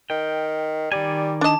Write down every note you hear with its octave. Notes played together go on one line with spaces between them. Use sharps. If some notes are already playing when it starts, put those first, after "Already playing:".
D#3 G5
D#3 G3 D5 G#5
D4 D#5 A5 D6